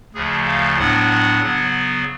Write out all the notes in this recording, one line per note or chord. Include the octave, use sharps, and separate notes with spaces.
D2 C#3 F3 A3 G#4
F5
A2 F#3 B3 D4 F#5
C#3 F#3 B3